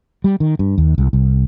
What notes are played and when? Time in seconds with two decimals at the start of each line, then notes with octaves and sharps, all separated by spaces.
0.24 G3
0.40 D#3
0.59 G2
0.78 D#2
0.98 C2
1.13 C2